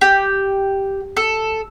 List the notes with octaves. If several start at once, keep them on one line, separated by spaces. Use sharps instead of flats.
G4
A4